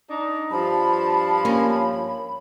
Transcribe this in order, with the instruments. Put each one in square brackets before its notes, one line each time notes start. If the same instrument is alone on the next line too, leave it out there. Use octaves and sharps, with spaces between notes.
[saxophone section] D4 D#4
[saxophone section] G2 F3 [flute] A5 [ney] B5
[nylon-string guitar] A#3 C#4